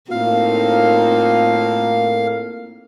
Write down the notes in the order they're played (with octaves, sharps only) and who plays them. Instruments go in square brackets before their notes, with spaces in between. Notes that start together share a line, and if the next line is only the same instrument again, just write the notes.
[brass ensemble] A2 A#3 [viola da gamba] C4 D#4 [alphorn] F4 [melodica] F5